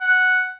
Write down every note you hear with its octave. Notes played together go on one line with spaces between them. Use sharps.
F#5